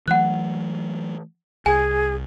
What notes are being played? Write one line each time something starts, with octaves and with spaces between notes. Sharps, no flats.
E3 F#3 A3 F#5 F#6
C2 G#4 G#5